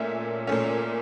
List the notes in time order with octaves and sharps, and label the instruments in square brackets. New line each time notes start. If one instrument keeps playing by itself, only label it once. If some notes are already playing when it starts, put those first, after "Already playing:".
Already playing: [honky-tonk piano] A#2 A3 C#4 E5
A#2 A3 C#4